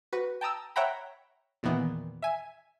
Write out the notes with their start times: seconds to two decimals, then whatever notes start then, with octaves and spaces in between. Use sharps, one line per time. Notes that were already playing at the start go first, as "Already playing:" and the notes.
0.13 F#4 B4
0.41 G5 A5 A#5 D#6 E6
0.76 C#5 E5 F#5 G5 A#5 B5
1.63 E2 A#2 D#3 E3 B3
2.22 E5 G#5